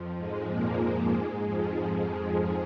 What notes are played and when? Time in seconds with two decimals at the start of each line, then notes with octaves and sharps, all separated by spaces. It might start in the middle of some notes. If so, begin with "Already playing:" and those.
Already playing: F2 F3
0.17 G#2 G#3
0.48 A#2 A#3
1.12 G#2 G#3
1.44 F2 F3